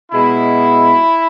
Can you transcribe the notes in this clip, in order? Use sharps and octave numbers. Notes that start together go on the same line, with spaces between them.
B2 G#3 E4